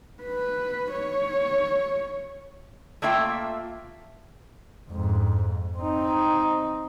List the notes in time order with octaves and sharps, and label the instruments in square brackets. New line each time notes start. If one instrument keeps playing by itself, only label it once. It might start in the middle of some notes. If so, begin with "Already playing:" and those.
[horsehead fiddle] B4
C#5
[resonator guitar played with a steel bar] A3 A#3 F4 E5 G5
[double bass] F2 G#2
C4 D#4